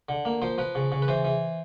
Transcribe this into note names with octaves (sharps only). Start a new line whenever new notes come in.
D3
A#3
F3 C5
F3 B4
C#3
C#3
B4
E3 C5
E3